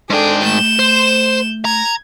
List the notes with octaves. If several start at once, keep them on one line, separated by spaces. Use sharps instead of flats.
G#2 D4 G#4 A4 G5
A3 G6 E7
C5
A#5 G#6